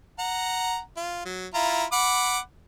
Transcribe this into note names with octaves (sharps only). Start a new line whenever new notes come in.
F#5 A#5
F4
F#3
E4 F4 A#5
F#5 B5 D6